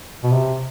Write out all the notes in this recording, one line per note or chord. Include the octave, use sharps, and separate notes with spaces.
B2
C3